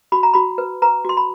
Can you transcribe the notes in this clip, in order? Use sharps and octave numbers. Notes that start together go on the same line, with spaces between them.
F#4 B5
A#5
F#4 B5
B4
B4 A#5
F#4 C6
B5